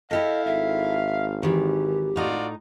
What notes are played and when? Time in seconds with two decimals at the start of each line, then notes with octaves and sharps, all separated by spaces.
0.11 E4 G4 A4 D#5 F5
0.46 G#1 E5
1.43 D#3 E3 G4
2.16 A2 D#4 F4 F#4 D5 A#5